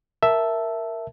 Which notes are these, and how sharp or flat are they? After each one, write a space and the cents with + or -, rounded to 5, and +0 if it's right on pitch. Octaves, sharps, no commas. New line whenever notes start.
A#4 +0 E5 +0 A5 +0